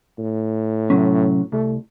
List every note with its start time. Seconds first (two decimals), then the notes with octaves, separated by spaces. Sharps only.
0.19 A2
0.90 C3 F#3 C#4
1.52 C2 A3